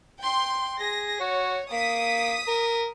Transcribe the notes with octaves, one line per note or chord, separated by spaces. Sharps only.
G5 C6
G#4 A#6
F#4 C#5
A#3 D#6 B6
A#4